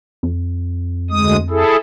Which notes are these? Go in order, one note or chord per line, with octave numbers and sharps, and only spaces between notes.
F2
D2 G#3 D#6
E4 G#4 A4